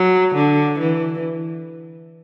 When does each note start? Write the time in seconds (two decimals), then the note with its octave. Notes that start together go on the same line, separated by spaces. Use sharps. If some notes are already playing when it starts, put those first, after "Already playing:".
Already playing: F#3
0.35 D3
0.79 E3